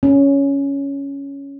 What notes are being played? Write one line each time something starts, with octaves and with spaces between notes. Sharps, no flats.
C#4